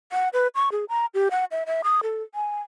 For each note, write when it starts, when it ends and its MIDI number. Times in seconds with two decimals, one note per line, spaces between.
0.12 0.29 78
0.33 0.48 71
0.55 0.69 85
0.72 0.85 68
0.89 1.06 82
1.14 1.29 67
1.31 1.45 78
1.51 1.64 76
1.66 1.82 76
1.84 2.01 87
2.03 2.23 69
2.35 2.61 80